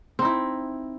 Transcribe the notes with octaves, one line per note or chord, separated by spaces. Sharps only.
C4 D#4 E4